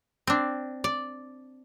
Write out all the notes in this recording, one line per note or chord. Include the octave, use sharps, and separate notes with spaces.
C4 D4
D5